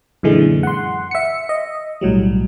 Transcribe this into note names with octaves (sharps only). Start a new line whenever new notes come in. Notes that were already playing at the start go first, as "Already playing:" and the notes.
F#2 A#2 D3 E3 G#3
F#5 C6
E5 C#7
D#5
B1 A2 F#3 G3